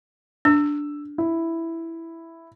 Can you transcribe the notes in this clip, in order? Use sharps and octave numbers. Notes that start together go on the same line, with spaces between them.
D4 E6
E4